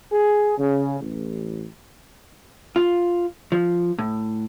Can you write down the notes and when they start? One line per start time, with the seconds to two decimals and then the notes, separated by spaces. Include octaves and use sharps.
0.11 G#4
0.58 C#3
1.00 A1
2.76 F4
3.52 F3
3.98 A2